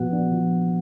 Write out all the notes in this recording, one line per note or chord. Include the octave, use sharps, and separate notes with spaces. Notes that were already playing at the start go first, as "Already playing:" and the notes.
Already playing: A#2 F3 B3 F#4 F#5
D4
F3